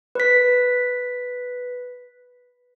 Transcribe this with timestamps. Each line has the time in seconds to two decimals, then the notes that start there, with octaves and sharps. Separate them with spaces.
0.15 B4 B6